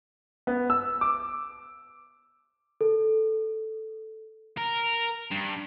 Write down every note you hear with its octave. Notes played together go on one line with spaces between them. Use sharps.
B3
E6
D6
A4
A#4
G2